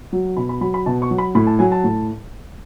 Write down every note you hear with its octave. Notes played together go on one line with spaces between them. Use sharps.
F#3
B2 B5
B5
F#3 B5
B5
B2 A5
C#6
F#3
B5
A2 B5
A5
F#3 G#5
A5
A2